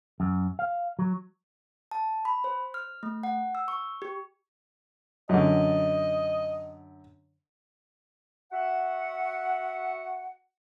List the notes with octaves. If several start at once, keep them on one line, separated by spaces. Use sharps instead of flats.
F#2
F5
F#3
A5
B5
C5
F6
A3
F#5
E6
C#6
G4
F#2 D3 D#5
F#4 E5 F#5